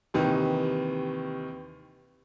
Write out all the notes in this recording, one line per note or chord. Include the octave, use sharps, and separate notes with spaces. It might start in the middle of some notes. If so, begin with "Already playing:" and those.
D#2 C3 D#3 E3